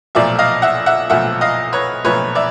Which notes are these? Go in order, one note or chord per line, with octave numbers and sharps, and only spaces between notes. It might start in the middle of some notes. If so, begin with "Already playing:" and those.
B1 A#2 F3 A3 D5 E5
D#5 F5
E5 F#5
E5 F#5
B1 A#2 F3 A3 E5 F#5
D#5 F5
B4 C#5
B1 A#2 F3 A3 B4 C#5
D5 E5